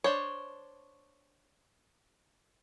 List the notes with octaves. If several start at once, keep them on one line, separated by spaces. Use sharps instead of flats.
D4 C5 C#5